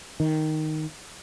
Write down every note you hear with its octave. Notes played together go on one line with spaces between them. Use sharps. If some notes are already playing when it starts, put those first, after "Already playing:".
D#3